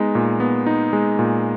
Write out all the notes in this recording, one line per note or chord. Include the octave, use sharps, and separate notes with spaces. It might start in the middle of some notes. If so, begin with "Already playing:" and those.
Already playing: G#3 B3 D#4
A#2
B3
D#4
G#3
A#2